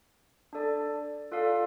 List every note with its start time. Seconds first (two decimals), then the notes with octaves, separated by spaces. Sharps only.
0.53 D4 A4 D5
1.32 F4 A4 D5 F5